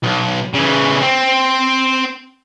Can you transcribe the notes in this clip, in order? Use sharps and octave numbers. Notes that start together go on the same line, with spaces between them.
B1
C#3 E3
C4